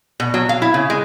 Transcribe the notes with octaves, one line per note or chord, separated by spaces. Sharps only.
B2
F#3
F5
E4
C#3
G#3